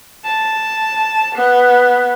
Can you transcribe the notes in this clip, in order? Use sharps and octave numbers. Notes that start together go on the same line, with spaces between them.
A5
B3